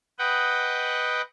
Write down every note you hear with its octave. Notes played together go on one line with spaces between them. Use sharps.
B4 D#5 F#5 G5